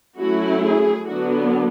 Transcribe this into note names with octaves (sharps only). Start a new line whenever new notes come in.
F#3 A3 C#4 E4 F#4
G#4
D3 F#3 B3 D4 F#4